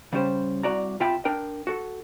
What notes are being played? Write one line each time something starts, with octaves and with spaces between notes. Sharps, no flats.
C#3 G3 C#4 G4 C5
C2 C3 F#4 D5 A#5
C3 F4 E5 G5 A5 B5
D4 A#4 G5
F#4 A4